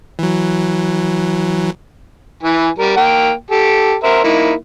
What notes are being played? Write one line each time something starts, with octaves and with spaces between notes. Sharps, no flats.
E3 F#3
E3 G#5
G3 A#4
A#3 A#4 G5
G4 A4
A#4 C5 E5
A#3 D#4 E4